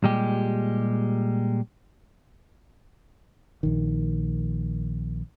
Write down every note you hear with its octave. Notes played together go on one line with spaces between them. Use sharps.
A#2 G3 G#3 G4
A#1 D#3